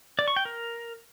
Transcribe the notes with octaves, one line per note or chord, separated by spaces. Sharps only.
D5
C#6
G5
A#4